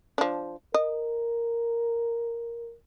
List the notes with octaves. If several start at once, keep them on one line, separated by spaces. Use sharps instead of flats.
F3 D4
A#4 D#5